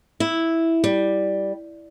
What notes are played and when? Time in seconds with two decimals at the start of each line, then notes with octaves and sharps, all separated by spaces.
0.20 E4
0.84 G3